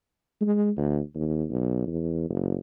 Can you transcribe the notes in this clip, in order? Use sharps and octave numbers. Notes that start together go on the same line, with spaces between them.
G#3
D2
D#2
B1
E2
F#1